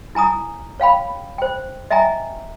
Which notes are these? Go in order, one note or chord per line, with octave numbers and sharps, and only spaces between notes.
E4 G#5 A#5 D#6
C#5 F5 G5 B5
C5 G5
D#5 E5 G5 G#5 A#5